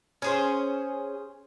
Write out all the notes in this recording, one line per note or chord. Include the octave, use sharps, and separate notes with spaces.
C#4 G#4 C5